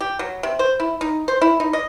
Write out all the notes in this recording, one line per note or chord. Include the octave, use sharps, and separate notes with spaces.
G4
F#3
C3
C5
E4
D#4
C5
E4
D#4
D#5